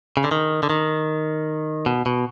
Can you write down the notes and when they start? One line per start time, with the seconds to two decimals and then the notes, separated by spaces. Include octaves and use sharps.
0.17 C#3
0.24 D3
0.31 D#3
0.63 D3
0.70 D#3
1.86 B2
2.06 B2